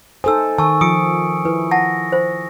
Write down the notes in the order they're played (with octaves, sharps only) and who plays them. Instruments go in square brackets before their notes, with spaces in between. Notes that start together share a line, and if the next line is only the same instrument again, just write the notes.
[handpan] D#4 A4 C5 [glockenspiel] G#5 [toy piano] D#6 E6
[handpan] D#3 [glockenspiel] G#5 C#6 E6 [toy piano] A5
[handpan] F3 [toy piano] F4 [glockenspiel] D#6 C#7 D7
[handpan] E4 [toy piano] B4
[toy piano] F#5 A5 [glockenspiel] A#6
[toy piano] C5